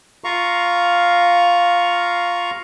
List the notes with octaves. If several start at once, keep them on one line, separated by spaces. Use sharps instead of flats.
F4 F5 A#5 C#6